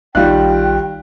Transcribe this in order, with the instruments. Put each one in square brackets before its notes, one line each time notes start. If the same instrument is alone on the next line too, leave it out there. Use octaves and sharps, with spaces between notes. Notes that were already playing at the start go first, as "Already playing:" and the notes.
[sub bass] A#1 [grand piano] D#3 G3 [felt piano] F4 F5 F#6 [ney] G5